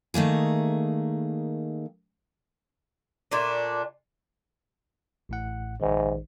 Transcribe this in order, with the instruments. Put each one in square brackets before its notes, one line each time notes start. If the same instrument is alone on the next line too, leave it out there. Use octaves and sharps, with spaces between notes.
[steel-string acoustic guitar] D#3 A3 A#3 G#4
[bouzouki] A#2 A3 D4
[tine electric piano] A1 A2 F#5
[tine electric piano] A#1 D#3 [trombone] G#2